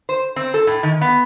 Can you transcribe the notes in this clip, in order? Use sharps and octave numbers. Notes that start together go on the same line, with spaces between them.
C5
C4
A4
A2
D#3
B3